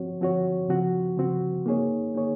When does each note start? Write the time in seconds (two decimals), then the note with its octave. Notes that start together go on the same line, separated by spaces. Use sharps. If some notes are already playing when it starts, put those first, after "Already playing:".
Already playing: F3 C4 F#4 C#5
0.21 F3 C4 F#4 C#5
0.68 C#3 F3 C4 F#4
1.18 C#3 F3 C4 F#4
1.66 A#3 D#4 G#4 C#5
2.14 A#3 D#4 G#4 C#5